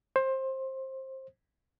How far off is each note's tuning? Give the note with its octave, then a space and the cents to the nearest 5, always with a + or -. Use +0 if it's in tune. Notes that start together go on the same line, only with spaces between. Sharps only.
C5 +20